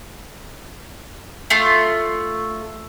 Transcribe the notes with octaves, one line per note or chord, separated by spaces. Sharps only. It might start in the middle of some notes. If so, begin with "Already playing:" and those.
A3 F4